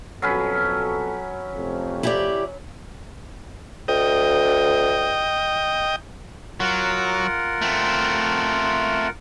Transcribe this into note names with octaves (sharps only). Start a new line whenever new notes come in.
F2 B2 F#3 C#4 A4 B4
F2 C3 A3
E4 G4 D5
D2 D#5 G5
F#3 F4 A#4 F#5
A3 C4